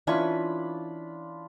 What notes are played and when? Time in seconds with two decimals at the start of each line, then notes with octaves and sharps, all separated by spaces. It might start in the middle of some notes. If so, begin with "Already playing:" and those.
0.07 E3 C#4 D4 F4 B5 C#6